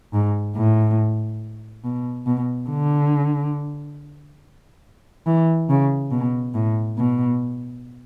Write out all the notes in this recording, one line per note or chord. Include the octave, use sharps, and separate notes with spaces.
G#2
A2
B2
B2
D3
E3
C#3
B2
A2
B2